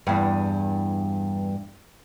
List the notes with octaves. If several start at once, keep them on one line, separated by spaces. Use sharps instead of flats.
E2 G2